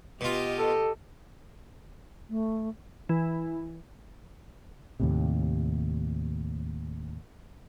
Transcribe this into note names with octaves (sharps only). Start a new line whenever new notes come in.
B2 F4 G4 D#5
A4
A3
E3
D#2 A2 C3